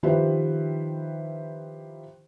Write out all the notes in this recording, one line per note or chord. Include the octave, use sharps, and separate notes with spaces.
D#3 F3 E4 G4 B4 C5